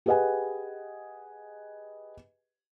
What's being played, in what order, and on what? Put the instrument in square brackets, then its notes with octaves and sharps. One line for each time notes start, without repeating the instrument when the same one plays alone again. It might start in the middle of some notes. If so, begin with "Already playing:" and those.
[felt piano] G4 G#4 B4 D#5 F#5 G#5